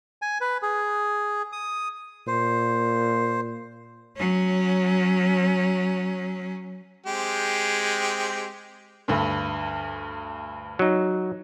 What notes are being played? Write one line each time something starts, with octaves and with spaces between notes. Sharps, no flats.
G#5
B4
G#4
D#6
A#2 C5
F#3 C#4
G#3 C4 G4
D2 G2
F#3 D#4